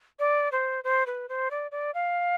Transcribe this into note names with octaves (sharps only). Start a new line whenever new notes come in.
D5
C5
C5
B4
C5
D5
D5
F5